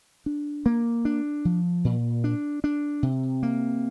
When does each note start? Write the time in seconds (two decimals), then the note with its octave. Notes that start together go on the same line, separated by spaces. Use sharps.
0.26 D4
0.66 A#3
1.05 D4
1.45 F3
1.85 A#2
2.24 D4
2.64 D4
3.03 C3
3.43 A#3